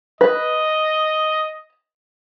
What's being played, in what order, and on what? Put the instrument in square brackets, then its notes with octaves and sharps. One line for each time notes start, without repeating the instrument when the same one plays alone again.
[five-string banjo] B4 [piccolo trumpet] D#5